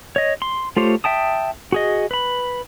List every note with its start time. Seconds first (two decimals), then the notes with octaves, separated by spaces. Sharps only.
0.16 C#5 D#5
0.42 C6
0.77 A3 F4 G4 C5 C#5
1.04 E5 G5 A5 D#6
1.72 F#4 G#4 D#5
2.11 B4 B5